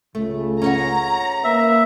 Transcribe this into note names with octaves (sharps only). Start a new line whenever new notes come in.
C#2 C#3 A3
C#4 C#5 F#5 A#5
A#3 B4 E5